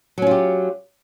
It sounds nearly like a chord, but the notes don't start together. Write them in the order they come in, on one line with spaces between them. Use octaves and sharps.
F#3 C#4 F4 G4